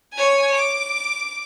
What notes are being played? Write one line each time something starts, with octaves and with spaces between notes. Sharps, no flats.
C#5 G#5
D6